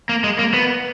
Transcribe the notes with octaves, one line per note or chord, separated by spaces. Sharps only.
A#3
G#3
A#3
B3